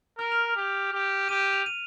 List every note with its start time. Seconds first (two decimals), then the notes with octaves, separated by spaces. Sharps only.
0.18 A#4 F6
0.32 F7
0.56 G4
0.93 G4
1.29 G4 D#7
1.41 D#7
1.53 F7
1.66 D#7